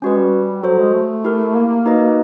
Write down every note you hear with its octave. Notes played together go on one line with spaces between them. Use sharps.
G#3 C#4 F#4 B4
G3
F#3 F#4 A4 C5
G#3
A3
E4 G4 A#4
A#3
D#4 F#4 B4 D#5